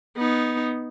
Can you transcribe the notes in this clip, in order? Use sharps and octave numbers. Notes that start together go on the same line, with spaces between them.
B3 D#4